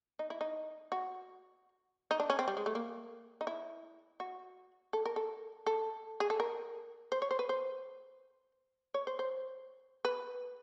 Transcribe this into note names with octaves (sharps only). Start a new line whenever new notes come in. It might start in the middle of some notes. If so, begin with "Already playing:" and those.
D#4
E4
D#4
F#4
D#4
D4
C#4
C4
G3
G#3
A3
A#3
D#4
E4
F#4
A4
A#4
A4
A4
G#4
A4
A#4
C5
C#5
C5
B4
C5
C#5
C5
C5
B4